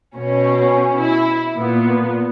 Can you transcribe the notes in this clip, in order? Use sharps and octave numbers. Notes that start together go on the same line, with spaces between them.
B2 C#4
E4
A#2 B3